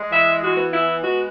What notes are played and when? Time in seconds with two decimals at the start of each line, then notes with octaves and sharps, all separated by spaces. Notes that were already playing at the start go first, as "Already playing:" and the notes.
Already playing: G#3
0.11 E3 E5
0.41 F#4
0.57 B3
0.71 E4
1.01 G#3 F#4